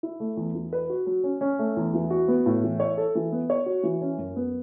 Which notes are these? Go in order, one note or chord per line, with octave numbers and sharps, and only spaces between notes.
E4
A3
E2
E3
B4
F#4
F#3
C#4
C#4
A3
E2
E3
F#4
B3
A2
E3
C#5
A4
E3
B3
C#5
F#4
E3
C#4
F#2
B3